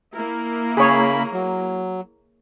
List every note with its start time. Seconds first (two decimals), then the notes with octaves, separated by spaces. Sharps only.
0.16 A#3 E4 A#4
0.77 C#3 G#4 C#5 B5
1.33 F#3